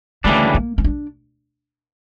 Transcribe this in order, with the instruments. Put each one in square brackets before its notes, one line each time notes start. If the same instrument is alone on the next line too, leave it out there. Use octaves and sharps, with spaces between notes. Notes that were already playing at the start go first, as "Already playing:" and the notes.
[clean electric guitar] D2 C#3 E3 G3 D4 [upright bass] A3
[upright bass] A#3
C#4
D4